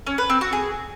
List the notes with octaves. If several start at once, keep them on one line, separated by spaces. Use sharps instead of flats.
C#4
B4
C4
F#4
G#4